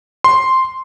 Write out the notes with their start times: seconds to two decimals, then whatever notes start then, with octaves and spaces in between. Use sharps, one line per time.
0.24 C6